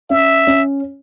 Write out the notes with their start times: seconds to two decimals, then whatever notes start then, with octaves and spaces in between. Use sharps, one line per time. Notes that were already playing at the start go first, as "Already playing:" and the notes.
0.10 C#4 E5
0.47 C#4